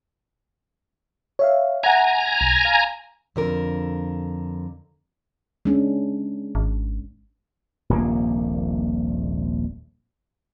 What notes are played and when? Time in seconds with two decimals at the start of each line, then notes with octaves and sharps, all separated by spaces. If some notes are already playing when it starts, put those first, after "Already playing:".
1.39 C#5 E5 F5
1.83 E5 F#5 G#5 A#5
2.41 B1
2.65 F5
3.36 F2 D3 A#4
5.65 G#3 C#4 D4
6.55 G#1
7.90 D#1 A#1 C3 A#3